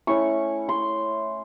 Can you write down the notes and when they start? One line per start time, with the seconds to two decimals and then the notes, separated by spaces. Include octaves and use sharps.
0.07 A3 C#4 E4 C#6
0.69 C6